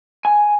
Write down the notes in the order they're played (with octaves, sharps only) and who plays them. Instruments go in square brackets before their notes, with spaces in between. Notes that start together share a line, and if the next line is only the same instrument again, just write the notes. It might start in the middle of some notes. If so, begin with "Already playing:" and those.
[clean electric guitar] G#5